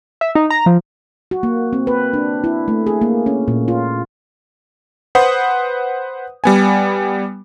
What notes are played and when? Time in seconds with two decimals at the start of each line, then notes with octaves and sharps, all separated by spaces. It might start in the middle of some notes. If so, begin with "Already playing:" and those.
0.21 E5
0.35 D#4
0.50 A#5
0.66 F3
1.31 F#4
1.43 A#3
1.73 C4
1.87 B4
2.13 D4
2.44 E4
2.68 A3
2.87 G#4
3.01 A#3
3.26 C#4
3.48 A#2
3.68 F4
5.15 B4 C5 F#5 D#6
6.44 G3 B3 G#5